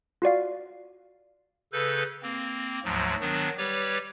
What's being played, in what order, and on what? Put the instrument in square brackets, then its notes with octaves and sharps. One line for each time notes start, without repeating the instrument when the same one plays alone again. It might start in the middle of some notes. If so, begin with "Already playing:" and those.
[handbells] F4 F#4 D5 F5
[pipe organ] C#3 A4 B4 G6
A#3 C4
D2 G#2 F3 F#3
D#3 F#3 B3 D4
G3 G4 B4 C#5